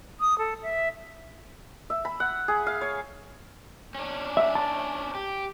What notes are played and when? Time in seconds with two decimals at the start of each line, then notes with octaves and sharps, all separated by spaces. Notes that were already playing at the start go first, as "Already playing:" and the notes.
0.20 D#6
0.39 A4
0.63 E5
1.90 E5
2.05 B5
2.20 F#5
2.48 G#4
2.67 F5
2.81 C#5
3.95 C#4 D4
4.37 E5
4.55 A5
5.15 G4